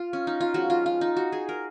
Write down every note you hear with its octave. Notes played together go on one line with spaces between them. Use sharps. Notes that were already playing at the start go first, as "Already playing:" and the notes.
Already playing: F4
C#4
D#4
F4
F3 G#3 C#4 F#4
F4
F4
D#4
F#4
G#4
A#4